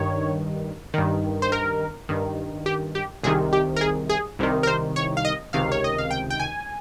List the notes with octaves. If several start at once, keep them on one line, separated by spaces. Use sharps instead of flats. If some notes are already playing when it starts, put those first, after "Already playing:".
Already playing: G2 D#3 C#5
G2 D#3
C5
A#4
G2 D#3
G4
G4
C2 C3 D#3 G#4
G4
A#4
G#4
G#4
C2 C3 D#3
A#4
C5
C#5
F5
D#5
C#2 C3 D#3 F5
C#5
D#5
F5
G5
G5
G#5